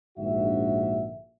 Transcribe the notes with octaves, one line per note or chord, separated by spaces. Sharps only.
A#1 G#2 D3 F#4 E5